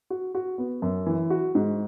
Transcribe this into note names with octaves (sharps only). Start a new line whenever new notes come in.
F#4
F#4
B3
F#2
E3
F#4
G#2